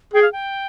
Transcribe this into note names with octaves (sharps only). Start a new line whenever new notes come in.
G#4 G5
F5
G5